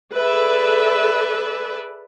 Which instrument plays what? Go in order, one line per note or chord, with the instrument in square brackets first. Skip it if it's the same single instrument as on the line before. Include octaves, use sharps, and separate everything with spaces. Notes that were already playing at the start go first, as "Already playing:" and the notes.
[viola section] G#4 A4 B4 D5 E5